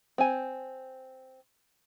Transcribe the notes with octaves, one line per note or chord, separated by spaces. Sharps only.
C4 G#5